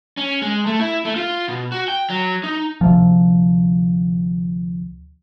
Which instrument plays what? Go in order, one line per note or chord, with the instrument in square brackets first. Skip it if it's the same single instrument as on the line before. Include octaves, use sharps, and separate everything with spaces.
[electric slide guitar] C#4
G#3
A3
E4
A3
F4
B2
F#4
G5
F#3
D#4
[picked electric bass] D2 C3 F3